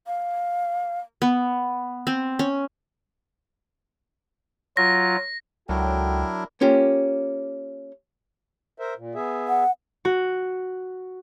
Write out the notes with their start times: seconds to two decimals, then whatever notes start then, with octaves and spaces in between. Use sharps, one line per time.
0.07 F5
1.22 B3
2.07 C4
2.39 C#4
4.77 F#3 F4 A#6
5.69 C#2 F#3 D4 E4 F#4 A4 A#4 G5
6.61 A#3 C#4 F4 G4
8.78 A#4 C5 E5
8.98 A#2
9.15 B3 G#4 E5
9.48 F#5
10.05 F#4